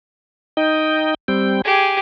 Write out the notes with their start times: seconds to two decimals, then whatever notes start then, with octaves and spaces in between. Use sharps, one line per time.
0.57 D#4 D#5 G5
1.28 G3 C4 G5
1.65 G4 G#4 G#5